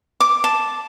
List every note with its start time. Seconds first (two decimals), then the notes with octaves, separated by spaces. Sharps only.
0.20 D6
0.44 A5